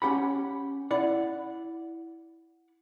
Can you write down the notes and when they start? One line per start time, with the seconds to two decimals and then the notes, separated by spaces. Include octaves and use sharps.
0.02 C#4 G4 F#5 B5
0.91 E4 D5 F#5